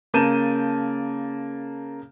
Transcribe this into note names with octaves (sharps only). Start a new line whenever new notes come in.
C#3 A#3 A5 G6 D#7 E7